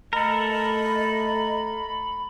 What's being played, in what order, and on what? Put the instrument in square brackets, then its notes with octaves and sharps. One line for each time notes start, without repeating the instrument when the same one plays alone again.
[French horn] A3 [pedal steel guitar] A4 A#4 [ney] D#5 [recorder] B5